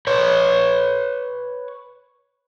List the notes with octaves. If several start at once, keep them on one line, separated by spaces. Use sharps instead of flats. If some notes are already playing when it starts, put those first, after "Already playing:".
B4 C#5